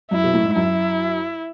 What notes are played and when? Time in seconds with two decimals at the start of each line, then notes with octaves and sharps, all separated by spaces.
0.11 F#2 E4
0.24 B2
0.34 A2
0.45 G#2
0.55 F#2 E4